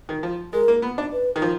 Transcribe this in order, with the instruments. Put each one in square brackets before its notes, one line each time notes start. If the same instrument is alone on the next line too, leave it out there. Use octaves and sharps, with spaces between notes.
[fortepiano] D#3
F3
[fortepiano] G#3 [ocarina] A#4
[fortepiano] A#3
B3
D4
[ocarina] B4
[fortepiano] D#3
F3